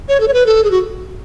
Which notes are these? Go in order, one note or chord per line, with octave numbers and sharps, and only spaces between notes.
C#5
A4
C#5
B4
A4
G#4
F#4